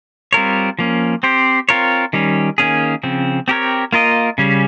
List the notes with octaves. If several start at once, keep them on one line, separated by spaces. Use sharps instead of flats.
G3 C4 F4 A#4 C#5
F3 A#3 C#4
C4 G4 C5
C4 F4 A#4 C#5
D#3 G3 C#4
D#3 A#3 C#4 G#4
C#3 F3 C4
C4 G4 A#4 C#5
A#3 F4 A#4 D#5
C#3 G3 C#4